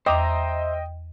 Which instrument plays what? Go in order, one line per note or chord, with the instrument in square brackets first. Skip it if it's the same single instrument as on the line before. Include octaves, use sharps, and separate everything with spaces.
[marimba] E2 D6 D#6 [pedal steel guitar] C5 E5 A#5 [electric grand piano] D#5 G5